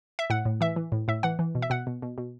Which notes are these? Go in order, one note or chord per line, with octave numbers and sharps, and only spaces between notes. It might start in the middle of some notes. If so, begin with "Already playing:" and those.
E5
A2 F#5
A2
E3 E5
E3
A2
A2 E5
E3 F#5
E3
B2
E5
B2 F#5
B2
B2
B2